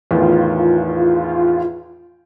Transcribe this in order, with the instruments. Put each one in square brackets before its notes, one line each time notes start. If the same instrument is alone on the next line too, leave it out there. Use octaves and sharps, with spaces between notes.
[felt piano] E2 A2 D#3 [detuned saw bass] F4